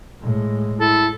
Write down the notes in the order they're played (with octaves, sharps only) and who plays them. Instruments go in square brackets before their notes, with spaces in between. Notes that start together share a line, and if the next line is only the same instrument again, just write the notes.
[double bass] A2 G#3
[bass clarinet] E4 [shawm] A4